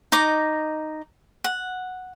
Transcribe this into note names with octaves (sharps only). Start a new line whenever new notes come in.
D#4 D#5 D6
F#5